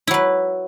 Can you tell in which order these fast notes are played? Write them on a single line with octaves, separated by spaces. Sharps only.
E4 F#3 B4